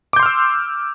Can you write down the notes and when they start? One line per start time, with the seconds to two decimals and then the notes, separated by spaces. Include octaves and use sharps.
0.13 D6
0.16 G6
0.20 C6
0.23 F6
0.26 E6